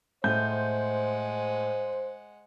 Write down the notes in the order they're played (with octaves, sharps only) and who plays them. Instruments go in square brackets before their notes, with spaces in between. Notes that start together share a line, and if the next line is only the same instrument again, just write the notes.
[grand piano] A2 [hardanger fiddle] G#3 F#5 [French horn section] C5 [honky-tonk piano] G6